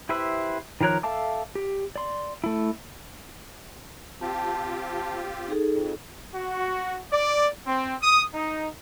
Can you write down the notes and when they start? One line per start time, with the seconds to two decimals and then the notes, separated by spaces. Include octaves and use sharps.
0.09 E4 G4 B4 C5 E5
0.81 D#3 F3 A#4 C#5 F#6
1.03 A4 E5 F5 A5 D6
1.55 G4
1.96 D5 C6
2.44 A3 E4
4.21 C4 F4 G4 A5
5.48 D#4 G#4 A4
5.71 F2
6.34 F#4
7.11 D5
7.66 C4
8.01 D#6
8.34 D#4